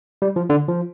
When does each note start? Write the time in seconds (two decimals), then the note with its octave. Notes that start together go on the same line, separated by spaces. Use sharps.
0.22 G3
0.36 F3
0.50 D3
0.69 F3